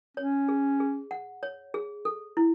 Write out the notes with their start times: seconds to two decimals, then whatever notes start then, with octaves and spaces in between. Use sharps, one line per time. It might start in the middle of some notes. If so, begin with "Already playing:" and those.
0.17 C#4 C#5
0.49 G#4
0.80 G#4
1.11 F#5
1.43 C#5
1.74 G#4
2.05 A4
2.37 E4